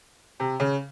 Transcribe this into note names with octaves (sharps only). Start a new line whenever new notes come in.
C3
C#3